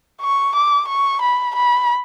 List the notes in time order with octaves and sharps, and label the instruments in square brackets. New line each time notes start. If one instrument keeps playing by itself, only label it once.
[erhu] C#6
D6
C#6
B5
B5